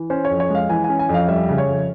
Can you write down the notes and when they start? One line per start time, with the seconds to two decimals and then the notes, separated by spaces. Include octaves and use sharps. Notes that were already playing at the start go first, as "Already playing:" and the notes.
Already playing: E3
0.10 C#4 C5
0.25 C#5
0.30 F2
0.40 C#5
0.50 G#3 F5
0.69 E3 G#5
0.84 C#4 G#5
0.99 G#5
1.09 F2
1.14 F5
1.28 G3 E5
1.49 C#3
1.58 C#5
1.68 F2